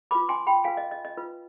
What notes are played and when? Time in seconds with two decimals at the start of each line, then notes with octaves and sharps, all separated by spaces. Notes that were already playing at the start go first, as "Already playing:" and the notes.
0.11 F4 B4 B5 D6
0.29 G#5 C6
0.47 G5 B5
0.64 F4 B4 F5 G#5
0.77 D#5
0.91 D#5
1.05 D#5
1.17 F4 B4